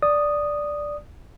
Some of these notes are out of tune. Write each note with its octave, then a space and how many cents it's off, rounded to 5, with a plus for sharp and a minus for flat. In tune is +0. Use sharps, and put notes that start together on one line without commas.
D5 +0 D#6 -10